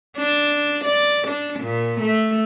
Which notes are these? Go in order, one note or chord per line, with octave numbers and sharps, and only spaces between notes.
D4
D5
D4
A#2
A3